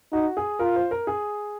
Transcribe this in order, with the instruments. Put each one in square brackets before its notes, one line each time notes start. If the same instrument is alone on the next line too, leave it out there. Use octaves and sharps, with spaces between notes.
[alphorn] D#4 [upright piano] F#4
[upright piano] G#4
[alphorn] F4 [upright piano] A#4
[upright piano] C5
A#4
G#4